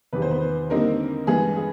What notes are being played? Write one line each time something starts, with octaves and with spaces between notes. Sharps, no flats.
E2 C3 D#3 B4
C5
B3 B4
D3 G3 A#3 C4 D#4 A#4
G2 E3 G#3 B3 G#4
G#4